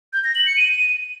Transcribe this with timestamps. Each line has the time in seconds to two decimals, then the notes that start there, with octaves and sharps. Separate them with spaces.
0.13 G6
0.24 A#6
0.35 F#7
0.46 C#7
0.57 D#7